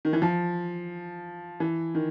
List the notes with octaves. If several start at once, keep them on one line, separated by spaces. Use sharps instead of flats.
D#3
E3
F3
E3
D#3